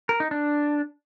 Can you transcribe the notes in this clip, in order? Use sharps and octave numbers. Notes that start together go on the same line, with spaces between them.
A#4
D#4
D4